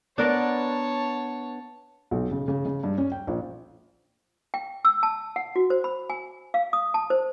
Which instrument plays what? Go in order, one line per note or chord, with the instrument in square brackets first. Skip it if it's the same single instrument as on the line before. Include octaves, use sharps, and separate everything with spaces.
[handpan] B3 [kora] D4 A#4 D5 [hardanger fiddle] C#5 A5
[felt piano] B1
C#3
C#3
C#3
G2
C#4
G5
A#1
[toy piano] G5
E6
A5
F#5
F#4
C5
B5
G#5
F5
D#6
A5
C5